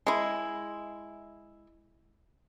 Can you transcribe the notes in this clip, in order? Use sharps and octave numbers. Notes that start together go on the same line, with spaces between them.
G#3 E4